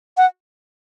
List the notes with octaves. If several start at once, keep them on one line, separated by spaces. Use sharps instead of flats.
F#5